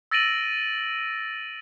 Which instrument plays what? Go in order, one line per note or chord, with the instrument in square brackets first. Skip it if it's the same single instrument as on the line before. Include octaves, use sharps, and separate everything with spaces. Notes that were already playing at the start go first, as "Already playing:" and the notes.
[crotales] E6 A6 A#6 D7 D#7 F#7